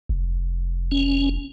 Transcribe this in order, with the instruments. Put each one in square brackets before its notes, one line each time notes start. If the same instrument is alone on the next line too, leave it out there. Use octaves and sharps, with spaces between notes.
[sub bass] F1
[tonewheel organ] C#4